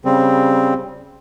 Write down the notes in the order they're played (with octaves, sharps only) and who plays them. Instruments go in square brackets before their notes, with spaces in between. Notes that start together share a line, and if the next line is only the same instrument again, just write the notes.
[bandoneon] C#3 G3 C4